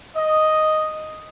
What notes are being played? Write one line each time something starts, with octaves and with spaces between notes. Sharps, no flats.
D#5